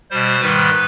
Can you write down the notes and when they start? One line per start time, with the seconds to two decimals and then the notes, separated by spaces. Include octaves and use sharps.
0.11 B2 G3 C5
0.40 G#2 D#3 G3 B4